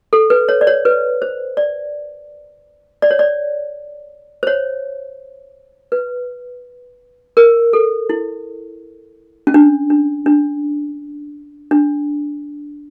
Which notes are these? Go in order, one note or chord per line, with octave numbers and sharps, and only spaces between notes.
A4
B4
C#5
D5
C#5
B4
C5
D5
D5
C#5
D5
C5
C#5
B4
A#4
A4
E4
C#4
D4
D4
D4
D4